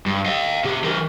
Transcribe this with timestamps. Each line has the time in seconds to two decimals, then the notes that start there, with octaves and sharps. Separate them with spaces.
0.06 G2
0.25 D#5 F5
0.64 B2 G4
0.84 E3 A#4